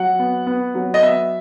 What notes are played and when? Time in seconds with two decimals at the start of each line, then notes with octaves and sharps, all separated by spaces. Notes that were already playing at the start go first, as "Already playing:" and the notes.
Already playing: F#3 F#5
0.19 B3
0.46 B3
0.74 F#3
0.94 D#5
1.02 B3 E5